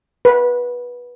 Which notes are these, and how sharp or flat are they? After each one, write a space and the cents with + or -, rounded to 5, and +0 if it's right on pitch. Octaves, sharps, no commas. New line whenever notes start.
B4 -20